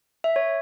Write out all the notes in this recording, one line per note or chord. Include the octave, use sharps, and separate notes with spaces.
E5
C#5